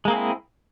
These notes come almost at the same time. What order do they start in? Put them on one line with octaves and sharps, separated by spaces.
G#3 A#3 G#4 C4 E4